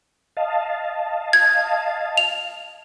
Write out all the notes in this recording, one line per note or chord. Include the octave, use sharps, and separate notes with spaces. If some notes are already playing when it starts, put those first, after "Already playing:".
D#5 F5 A5
G#6
F7